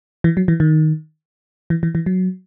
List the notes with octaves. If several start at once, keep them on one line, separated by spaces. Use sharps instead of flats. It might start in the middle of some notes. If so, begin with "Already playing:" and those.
E3
F#3
E3
D#3
E3
E3
E3
F#3